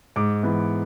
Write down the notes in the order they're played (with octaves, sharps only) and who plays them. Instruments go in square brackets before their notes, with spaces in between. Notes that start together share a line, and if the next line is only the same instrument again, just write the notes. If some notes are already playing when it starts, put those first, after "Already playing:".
[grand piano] G#2 D6
E3 B3